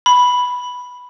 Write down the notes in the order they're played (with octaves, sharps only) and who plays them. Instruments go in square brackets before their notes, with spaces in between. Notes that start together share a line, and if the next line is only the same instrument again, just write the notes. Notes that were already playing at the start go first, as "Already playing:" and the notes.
[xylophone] B5